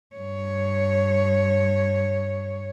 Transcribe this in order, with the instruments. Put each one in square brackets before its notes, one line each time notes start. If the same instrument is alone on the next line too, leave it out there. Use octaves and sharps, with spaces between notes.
[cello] G2 C#5